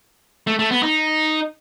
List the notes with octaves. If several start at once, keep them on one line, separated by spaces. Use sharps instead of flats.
A3
A3
B3
D#4